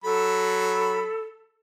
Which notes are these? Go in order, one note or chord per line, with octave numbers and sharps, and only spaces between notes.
F#3 A4 B5